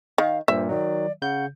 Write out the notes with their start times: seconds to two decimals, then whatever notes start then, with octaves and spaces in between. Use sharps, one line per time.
0.18 D#3 F5
0.48 G2 A#2 C5 E5
0.69 D#3 F#3 D5
1.22 C#3 F#5 G6